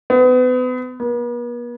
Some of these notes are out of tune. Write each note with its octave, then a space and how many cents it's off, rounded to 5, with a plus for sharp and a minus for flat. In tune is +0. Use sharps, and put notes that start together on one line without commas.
B3 +35
B3 -45